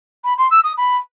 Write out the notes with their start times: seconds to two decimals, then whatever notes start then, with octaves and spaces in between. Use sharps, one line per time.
0.24 B5
0.38 C6
0.51 E6
0.64 D#6
0.78 B5